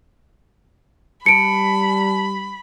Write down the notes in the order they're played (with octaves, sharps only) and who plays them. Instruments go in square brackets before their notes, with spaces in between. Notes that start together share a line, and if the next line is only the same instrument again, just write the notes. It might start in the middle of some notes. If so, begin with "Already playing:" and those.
[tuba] G3 [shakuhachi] A5 [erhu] B5 [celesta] C#7 D7